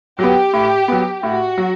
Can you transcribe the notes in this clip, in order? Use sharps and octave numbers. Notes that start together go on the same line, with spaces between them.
F#3 B3 G4
A2
F#3 B3
A2 F#4
F#3